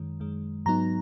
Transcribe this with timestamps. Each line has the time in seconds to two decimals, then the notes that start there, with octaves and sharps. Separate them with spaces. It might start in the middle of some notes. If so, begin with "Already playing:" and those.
Already playing: F#2 D#3 G#3
0.20 F#2 D#3 G#3
0.66 G#2 F#3 B3 D#4 A#5